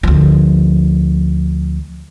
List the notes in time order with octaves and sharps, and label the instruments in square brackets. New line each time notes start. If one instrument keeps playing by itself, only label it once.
[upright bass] D2 F3